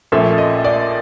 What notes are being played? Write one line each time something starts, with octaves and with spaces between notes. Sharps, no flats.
A#1 A#2 F3 A3 C#4 E5
D#5
D5